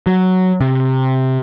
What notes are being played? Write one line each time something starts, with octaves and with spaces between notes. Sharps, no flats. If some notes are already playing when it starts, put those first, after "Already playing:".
F#3
C3